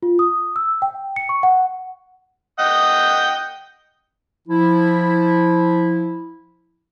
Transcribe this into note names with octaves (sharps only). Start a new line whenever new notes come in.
F4
D#6
E6
G5
C#7
C#6
F#5
D#5 F#5 G5
F3 E4